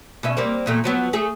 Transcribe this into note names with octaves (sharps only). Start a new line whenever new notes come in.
B2 C#4 E5
G3 A#3 C4
E2 A#2 A3
F3 F#3 B3
A3 G#4